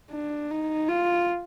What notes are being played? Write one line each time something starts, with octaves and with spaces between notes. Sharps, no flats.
D4
D#4
F4